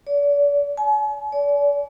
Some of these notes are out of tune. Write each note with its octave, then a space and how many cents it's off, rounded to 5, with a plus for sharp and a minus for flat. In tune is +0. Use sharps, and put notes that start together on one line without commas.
D5 -40
G#5 +45
D5 -40